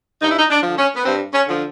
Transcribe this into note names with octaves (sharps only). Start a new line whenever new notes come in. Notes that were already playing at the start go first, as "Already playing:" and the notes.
G2 D#4
E4
D#4
D4
D3 F3
C#4
B3
G2 C4
C#4
D3 F3